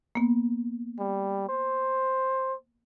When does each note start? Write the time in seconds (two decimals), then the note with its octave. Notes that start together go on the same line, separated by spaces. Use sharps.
0.15 A#3 B3
0.98 G3
1.48 C5